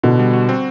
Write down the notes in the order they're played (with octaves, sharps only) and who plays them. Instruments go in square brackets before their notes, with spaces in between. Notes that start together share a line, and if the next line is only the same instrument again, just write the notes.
[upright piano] B2 [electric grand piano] D3
[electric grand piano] G3
F#4
C4